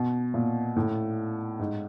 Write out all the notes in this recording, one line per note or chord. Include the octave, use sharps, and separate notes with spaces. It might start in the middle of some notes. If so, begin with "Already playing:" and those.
Already playing: B2
A#2
A2
G#2